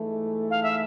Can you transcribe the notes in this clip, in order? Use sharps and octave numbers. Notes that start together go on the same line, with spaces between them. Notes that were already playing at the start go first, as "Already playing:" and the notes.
Already playing: G#2 E3 A3
F5
E5